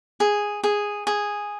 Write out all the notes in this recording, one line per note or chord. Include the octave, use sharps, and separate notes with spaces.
G#4
G#4
G#4